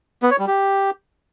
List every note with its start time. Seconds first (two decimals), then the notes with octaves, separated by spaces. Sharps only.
0.23 B3
0.31 C#5
0.39 G3
0.47 G4